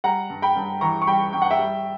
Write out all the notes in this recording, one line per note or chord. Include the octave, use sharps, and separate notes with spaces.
G3 F#5 A#5
G2
G5 B5
G2
E3 A#5 C#6
C#6
G3 G5 B5
G2 G5
F#5
E5 G5
G3